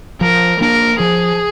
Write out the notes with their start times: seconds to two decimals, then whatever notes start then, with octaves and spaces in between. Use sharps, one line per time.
0.21 F3 A#4
0.61 A#3 D4 A#4
0.99 F3 G#4